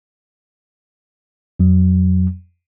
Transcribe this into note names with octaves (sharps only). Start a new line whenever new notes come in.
F2 F#3